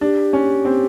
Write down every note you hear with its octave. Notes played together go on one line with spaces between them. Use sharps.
D4 G4
C#4
C4